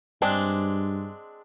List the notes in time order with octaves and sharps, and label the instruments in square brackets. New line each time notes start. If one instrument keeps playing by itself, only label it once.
[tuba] G2 [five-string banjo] G#3 C4 D4